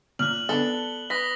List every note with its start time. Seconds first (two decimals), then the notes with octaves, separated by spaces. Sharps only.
0.19 A#2 F6 F#6 F#7
0.49 B3 D4 A4 G7
1.10 B4 D#6 A#6 B6